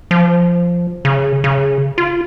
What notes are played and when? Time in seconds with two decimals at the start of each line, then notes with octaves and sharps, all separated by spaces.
0.11 F3
1.05 C#3
1.44 C#3
1.98 F4